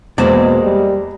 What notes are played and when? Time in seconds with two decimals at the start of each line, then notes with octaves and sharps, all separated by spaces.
0.18 E2 B2 G#3 A#3 C5 D5
0.63 G3